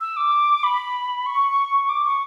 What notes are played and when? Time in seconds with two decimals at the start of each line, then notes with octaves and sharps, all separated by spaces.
0.01 E6
0.17 D6
0.63 B5
1.26 C#6
1.89 D6
2.05 C#6